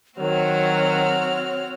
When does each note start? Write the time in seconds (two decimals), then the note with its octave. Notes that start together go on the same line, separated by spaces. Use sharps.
0.19 D#3 F#3 C4 F#4 C#5 F6